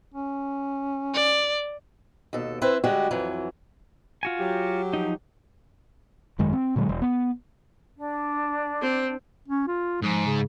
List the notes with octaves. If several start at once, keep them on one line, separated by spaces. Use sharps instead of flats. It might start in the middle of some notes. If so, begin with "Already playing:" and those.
C#4
D5
D#2 B2 A4
C4 E4 B4 C5
D3 G3 G#3 F#4 G4
F2 E3 F#3
F4 F#4 G#5
F#3 G4
F3 D#4
G#1 F#2 D#3 G#3
C4
A#2 D3 F#3 G#3
E1
B3
D4
C4
C#4
F4
G#2 F3
C#3